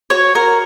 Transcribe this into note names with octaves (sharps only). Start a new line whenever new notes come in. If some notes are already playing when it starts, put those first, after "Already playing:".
F#4 C#5
F#4 A#4